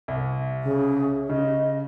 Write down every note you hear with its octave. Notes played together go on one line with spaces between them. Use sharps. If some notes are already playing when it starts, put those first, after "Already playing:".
C2
C#3
C#3 D#5